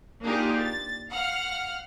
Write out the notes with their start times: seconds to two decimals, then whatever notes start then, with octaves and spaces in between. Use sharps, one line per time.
0.23 A#3 D4 D#4 F4 G4 G#4
0.62 A6
1.10 F5 F#5 F6